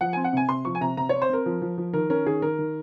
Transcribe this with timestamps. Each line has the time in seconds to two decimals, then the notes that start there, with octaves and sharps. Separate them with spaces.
0.01 F3 F#5
0.13 C4 G#5
0.24 F#5
0.33 C3 G#5
0.49 C3 C6
0.65 F3 C#6
0.75 G#5
0.81 C3 A#5
0.97 C3 A#5
1.09 C4 C#5
1.22 C5
1.30 C4 A#4
1.46 F3
1.62 F3
1.78 F3
1.94 D#3 A#4
2.10 C#4 A#4
2.26 D#3 G#4
2.42 D#3 A#4
2.59 D#3